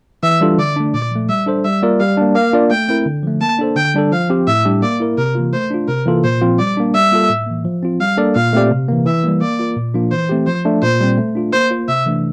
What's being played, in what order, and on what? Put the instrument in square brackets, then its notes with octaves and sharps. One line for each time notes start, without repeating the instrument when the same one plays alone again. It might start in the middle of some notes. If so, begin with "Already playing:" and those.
[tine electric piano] E3 [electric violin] E5
[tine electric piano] G3 D4 F4 A4
[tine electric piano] D3 [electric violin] D5
[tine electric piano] A3 D4
[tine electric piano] A#2 [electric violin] D5
[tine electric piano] F3 A3
[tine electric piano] G3 [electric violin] E5
[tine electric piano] D4 A4 C5
[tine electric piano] G3 [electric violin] E5
[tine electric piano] A#3 F4 A#4 D5
[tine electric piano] G3 [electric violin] F5
[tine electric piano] A#3 D4
[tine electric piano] A#3 [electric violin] F5
[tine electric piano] D4 F4 A#4 D5
[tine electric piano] A3 [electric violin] G5
[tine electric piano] C4 E4 A#4
D3
F3 A3
[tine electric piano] A#3 [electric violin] A5
[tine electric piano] D4 A4 C5
[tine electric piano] D3 [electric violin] G5
[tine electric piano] G3 D4 A4
[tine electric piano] F3 [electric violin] F5
[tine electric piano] C4 G4
[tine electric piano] A2 [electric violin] E5
[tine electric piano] G3 D4 G4
[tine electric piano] A#3 [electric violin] D5
[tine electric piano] E4 A#4
[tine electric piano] C3 [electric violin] A#4
[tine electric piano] E3 A#3 F4
[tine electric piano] A3 [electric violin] C5
[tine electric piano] D4 F4
[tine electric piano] C3 [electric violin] A#4
[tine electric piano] E3 A#3 F4 A4
[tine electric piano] A#2 [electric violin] C5
[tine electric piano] F3 C4 F4
[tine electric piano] G3 [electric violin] D5
[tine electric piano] A#3 D4
[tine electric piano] G3 [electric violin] E5
[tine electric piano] A#3 F4 A4
A2
E3 A#3
F3
C4 F4
[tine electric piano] G3 [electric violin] F5
[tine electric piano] A#3 D4 A4 D5
[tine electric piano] A#2 [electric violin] F5
[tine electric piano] A3 C4 G4 D5
C3
E3 A#3
[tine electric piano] E3 [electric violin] E5
[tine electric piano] G3 A#3
[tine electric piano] A#3 [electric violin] D5
[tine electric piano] F4 A#4
A#2
F3 A#3 D4 F4
[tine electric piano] E3 [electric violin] C5
[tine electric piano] A3 C4 G4
[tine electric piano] F3 [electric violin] C5
[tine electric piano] A3 D4
[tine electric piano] A#2 [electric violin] C5
[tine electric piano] G3 C4
A3
D4 F4
[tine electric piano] A#3 [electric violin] C5
[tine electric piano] F4 C5
[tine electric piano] C3 [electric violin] E5
[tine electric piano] E3 A3 D4